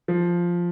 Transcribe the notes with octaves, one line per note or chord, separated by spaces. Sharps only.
F3